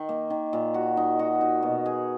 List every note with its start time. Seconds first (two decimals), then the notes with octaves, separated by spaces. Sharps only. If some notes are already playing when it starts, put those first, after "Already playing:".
Already playing: D#3
0.09 A#3
0.30 D#3
0.53 A#2
0.74 F#4
0.97 D#4
1.19 F#4
1.41 D#4
1.62 B2
1.86 G#4